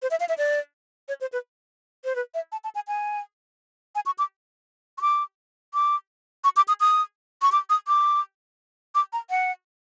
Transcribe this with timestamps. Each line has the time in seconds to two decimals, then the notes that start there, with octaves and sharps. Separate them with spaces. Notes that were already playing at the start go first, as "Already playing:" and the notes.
0.02 C5
0.11 E5
0.20 F5
0.29 E5
0.38 D5
1.08 C#5
1.21 C5
1.32 B4
2.04 C5
2.15 B4
2.34 E5
2.52 A5
2.64 A5
2.75 G#5
2.88 G#5
3.95 G#5
4.06 C#6
4.18 D6
4.98 C#6
5.01 D6
5.74 D6
6.44 C#6
6.57 D6
6.68 D#6
6.80 D#6
7.42 C#6
7.52 D6
7.70 D#6
7.88 D6
8.95 D6
9.13 A#5
9.30 F#5